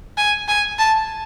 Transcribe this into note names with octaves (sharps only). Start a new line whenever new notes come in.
G#5
G#5
A5